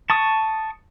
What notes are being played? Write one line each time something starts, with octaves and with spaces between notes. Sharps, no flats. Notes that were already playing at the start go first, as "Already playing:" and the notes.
A5 C#6 D#6